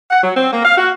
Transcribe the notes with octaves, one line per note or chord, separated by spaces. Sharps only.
F#5
F#3
C4
A#3
F5
F#4